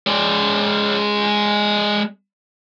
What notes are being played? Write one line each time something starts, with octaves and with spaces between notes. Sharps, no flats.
G#3 D5